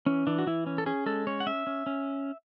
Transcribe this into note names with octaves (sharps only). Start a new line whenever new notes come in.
E3 C#4
E3 D4
F#4
E3 E4
C#4
A4
C#4 G#4
G#3 A4
C#4 C#5
F#5
C#4 E5
C#4
C#4